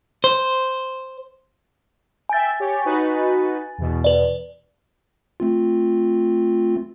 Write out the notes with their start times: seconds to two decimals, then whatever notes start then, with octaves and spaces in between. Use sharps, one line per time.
0.24 C5
2.29 E5 G5 G#5 A6
2.60 G4 C#5
2.85 D#4 F#4 B4
3.78 E2 B2
4.04 B4 D5
5.40 A3 C4 F4